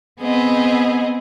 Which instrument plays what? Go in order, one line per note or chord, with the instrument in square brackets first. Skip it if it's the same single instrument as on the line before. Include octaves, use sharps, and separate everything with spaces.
[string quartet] B3 C4 G#4 D#5